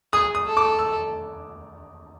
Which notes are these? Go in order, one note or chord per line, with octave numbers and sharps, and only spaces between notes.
G#4 D#6
D#6
A4
D6
E6